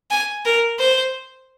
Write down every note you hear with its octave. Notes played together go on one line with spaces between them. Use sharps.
G#5
A#4
C5